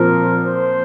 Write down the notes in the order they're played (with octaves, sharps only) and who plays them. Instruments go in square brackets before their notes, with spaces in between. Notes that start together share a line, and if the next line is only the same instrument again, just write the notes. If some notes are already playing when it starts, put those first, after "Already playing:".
Already playing: [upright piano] A#2 F3 C4 [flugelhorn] A#4
[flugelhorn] C5